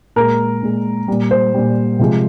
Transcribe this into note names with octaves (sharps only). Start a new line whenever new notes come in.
A#2 G#3 A#4
A#2 G#3
A#2 G3
C5
A#2 G3
C3 F3 G#3